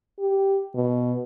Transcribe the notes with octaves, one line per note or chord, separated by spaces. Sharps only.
G4
B2